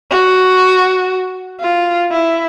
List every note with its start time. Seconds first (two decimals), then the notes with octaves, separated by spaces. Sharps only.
0.11 F#4
1.60 F4
2.11 E4